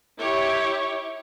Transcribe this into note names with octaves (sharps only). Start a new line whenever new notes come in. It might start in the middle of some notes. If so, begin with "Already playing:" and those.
E4 G4 C#5